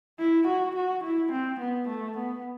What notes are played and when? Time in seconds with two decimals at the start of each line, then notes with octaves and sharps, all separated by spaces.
0.19 E4
0.47 F#4
0.76 F#4
1.04 E4
1.32 C4
1.60 B3
1.88 A3
2.17 B3